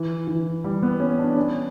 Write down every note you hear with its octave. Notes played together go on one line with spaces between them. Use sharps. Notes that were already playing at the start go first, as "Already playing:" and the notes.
Already playing: E3
E3
G3
B3
C#4
D4
C#4